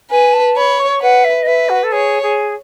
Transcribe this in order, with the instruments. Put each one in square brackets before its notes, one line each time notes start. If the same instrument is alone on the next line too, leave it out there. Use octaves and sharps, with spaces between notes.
[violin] B4 [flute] G#5
[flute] A5
[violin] C#5 [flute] B5
[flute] C#6
[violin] B4 [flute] F#5
[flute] E5
D#5
[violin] B4 [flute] E5
[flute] F#4
A4
[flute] G#4 [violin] C#5
[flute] G#4